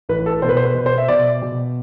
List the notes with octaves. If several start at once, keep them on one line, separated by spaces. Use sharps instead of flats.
A1 B4
A4
B2 C5
B4
C5
B4
B2
C5
E5
B2 D5
B2